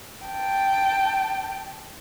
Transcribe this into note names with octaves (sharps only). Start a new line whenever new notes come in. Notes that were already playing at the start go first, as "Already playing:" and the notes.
G5 A5